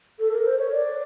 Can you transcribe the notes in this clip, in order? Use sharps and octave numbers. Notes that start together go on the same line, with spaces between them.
A4
A#4
C5
C#5
D5